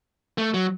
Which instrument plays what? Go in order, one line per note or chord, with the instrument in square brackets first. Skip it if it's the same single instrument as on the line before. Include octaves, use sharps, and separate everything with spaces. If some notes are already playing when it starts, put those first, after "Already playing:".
[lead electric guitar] A3
F#3